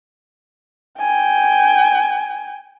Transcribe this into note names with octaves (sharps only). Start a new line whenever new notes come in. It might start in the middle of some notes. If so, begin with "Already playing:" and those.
G5 G#5